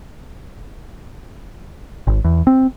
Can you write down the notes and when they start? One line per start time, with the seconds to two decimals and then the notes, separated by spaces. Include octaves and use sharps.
2.07 G#1
2.24 E2
2.47 C4